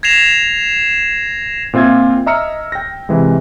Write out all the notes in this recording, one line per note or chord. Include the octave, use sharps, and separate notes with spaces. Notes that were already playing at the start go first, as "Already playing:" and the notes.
G#6 A#6 C7 E7 F7
A#2 C4 F4 E5 G#6
D#5 E5 A#5 E6 F6 C#7
G5 A#6
C3 E3 G#3